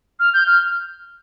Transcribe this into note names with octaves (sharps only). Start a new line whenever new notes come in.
F6
G6
F6